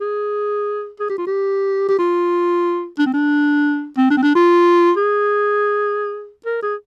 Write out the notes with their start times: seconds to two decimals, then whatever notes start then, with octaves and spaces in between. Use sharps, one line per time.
0.01 G#4
1.00 G#4
1.09 G4
1.18 F4
1.27 G4
1.89 G4
1.99 F4
2.99 D4
3.06 C4
3.14 D4
3.97 C4
4.10 D4
4.17 C4
4.23 D4
4.35 F4
4.97 G#4
6.46 A#4
6.62 G#4